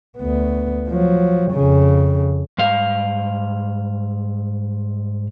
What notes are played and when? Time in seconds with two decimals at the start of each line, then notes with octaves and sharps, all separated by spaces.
0.18 D2 B3
0.88 F3 F#3
1.52 F2 C#3
2.58 G#2 G3 F5